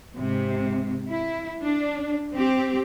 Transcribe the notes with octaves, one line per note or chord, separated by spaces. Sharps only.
G#2 C3
E4
D4
C4 G4